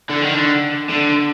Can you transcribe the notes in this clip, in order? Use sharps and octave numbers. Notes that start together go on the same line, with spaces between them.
D3
D#3
D3
D3